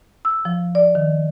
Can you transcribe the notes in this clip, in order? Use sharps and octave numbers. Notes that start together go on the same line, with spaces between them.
E6
F3
D5
D#3